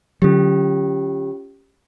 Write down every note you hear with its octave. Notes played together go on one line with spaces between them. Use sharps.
D3 F#3 C#4 F4 G4